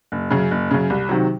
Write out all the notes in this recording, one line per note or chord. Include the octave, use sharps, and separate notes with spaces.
F#1
F#2 C#3
F#1
F#2 C#3
C2
C3 D#3 F#3